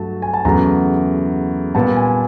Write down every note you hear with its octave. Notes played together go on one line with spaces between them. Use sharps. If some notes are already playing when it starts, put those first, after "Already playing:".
Already playing: G2 F#3 A3 A5
G#5
A5
E2 C#3 F#3 A3 A#5
A#2 G3 B3 A5
G#5